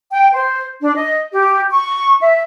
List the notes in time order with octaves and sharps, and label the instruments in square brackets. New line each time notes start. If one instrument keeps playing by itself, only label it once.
[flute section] G5
C5
D4
D#5
G4
C#6
E5